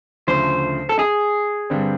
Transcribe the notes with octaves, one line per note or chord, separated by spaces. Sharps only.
D2 C#3 F3 A3 C5
A4
G#4
G2 D3 G3 C4